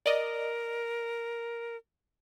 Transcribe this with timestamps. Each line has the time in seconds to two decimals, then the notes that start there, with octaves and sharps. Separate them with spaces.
0.06 A#4 D5 D#5